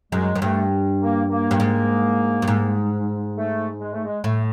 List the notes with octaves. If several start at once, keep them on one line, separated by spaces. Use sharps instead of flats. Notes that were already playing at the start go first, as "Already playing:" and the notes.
F#2 G#3
F#2
G2 A3
A#3
A#3
G2
G#2
G2
G#2
A3
G#3
A3
G#3
A2 A3